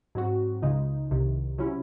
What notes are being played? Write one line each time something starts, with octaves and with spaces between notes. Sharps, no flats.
G#2 F#3 C4 F#4
C#2 C#3 G#3 D#4
C2 C3 D#3
C3 F#3 C#4 E4